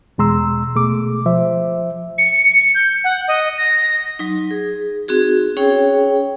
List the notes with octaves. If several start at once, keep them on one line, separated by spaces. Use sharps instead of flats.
E2 B2 G#3 A#5 C6 E6
B2 A3 G#4 D6
F3 C5 E5
C#7
G6
F#5
D#5
A#6
F#3 D#4
G#4
C4 D#4 F#4 G#4
C#4 G#4 C#5 G5